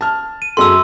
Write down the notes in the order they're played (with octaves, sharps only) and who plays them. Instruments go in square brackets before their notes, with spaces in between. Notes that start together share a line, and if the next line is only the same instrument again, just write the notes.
[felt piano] A5 F6
[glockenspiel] D#7
[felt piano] F#2 G#4 A4 [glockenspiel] C6 E6